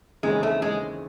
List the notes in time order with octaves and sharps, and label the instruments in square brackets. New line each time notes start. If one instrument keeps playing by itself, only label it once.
[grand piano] D#2 C#3 E3 C4 D#4 [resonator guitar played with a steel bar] G#3
[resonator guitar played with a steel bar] A3
G#3